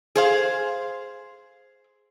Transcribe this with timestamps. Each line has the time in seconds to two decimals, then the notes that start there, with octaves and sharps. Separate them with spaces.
0.16 G#4 C5 F5